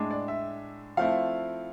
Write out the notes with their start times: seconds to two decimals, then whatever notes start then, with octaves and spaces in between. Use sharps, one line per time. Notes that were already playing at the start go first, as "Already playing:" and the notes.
Already playing: A2 G#3 D4
0.11 D5
0.28 E5
0.97 F3 A3 C4 E4 F5